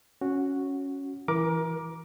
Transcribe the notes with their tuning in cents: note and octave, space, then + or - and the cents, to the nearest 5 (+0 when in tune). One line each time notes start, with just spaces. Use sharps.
C#4 +0 F#4 -5
E3 +0 A#4 +25 D6 +0